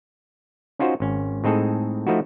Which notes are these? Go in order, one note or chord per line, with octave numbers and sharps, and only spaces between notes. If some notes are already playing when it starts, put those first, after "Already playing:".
C#4 D#4 F4 F#4 C5
G#1 C#4
A2 G#3 C4 D#4 G#4 A4
F3 A3 D#4 E4 F#4